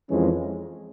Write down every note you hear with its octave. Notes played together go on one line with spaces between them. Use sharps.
F2 E3 G#3 C#4